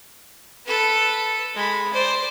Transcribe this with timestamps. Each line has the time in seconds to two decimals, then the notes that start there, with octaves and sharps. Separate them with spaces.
0.66 A4 B4
1.55 G#3 B5
1.93 C5 D5